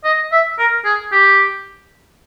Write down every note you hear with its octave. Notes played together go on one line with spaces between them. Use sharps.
D#5
E5
A#4
G#4
G4